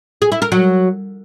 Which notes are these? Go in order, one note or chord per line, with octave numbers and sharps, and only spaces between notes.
G#4
E4
A#4
F#3